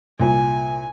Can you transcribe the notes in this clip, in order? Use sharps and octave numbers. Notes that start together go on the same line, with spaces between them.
C2 A#2 G#5